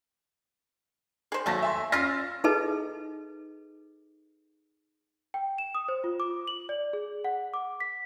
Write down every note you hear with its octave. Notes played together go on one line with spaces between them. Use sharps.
G#4 C5
D#2 F#3 A3 A5 A#6
E5 G#5 C6
C#4 F4 F5 E6 A6 A#6
D#4 G#4 A4 B4 D#5 A5
G5
E7
D#6
C5
F4
D6
F#7
D5
G#4
F#5
D6
B6